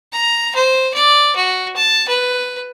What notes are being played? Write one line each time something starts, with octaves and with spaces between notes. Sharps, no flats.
A#5
C5
D5
F#4
A5
B4